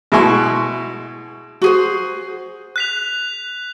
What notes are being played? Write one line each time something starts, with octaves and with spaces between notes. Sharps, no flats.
B2 G#3 E4 G#5 C6 C#6
F#4 G#4 C5
F#6 B6 F7